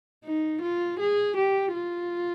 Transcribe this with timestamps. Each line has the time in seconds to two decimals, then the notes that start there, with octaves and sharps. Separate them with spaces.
0.24 D#4
0.62 F4
1.00 G#4
1.37 G4
1.74 F4